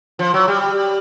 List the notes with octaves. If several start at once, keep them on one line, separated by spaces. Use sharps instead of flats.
F3
F#3
G3